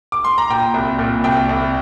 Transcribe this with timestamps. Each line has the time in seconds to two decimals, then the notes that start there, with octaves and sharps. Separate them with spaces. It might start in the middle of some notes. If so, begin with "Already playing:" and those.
0.12 D6
0.25 C6
0.38 A#5
0.50 A#2 G5
0.74 C2
0.99 A#2
1.24 C2 G5
1.49 C2